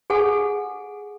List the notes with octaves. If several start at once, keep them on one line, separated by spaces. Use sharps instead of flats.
G#4 A4 F#5 G#5